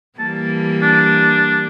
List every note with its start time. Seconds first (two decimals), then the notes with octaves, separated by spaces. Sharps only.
0.19 E3 G3 A#3 A5
0.82 D4